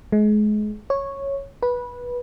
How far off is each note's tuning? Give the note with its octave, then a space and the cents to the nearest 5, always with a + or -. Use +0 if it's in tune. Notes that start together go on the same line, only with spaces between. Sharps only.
G#3 +30
C#5 -5
B4 -15